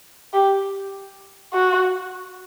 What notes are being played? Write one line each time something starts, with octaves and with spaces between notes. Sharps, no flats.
G4
F#4